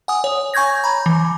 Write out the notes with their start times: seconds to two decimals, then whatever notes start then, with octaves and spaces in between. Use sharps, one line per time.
0.08 F#5 G#5 D#6
0.24 C#5
0.54 G#5 C#6 G6 G#6 A#6
0.84 A#5 B5
1.06 E3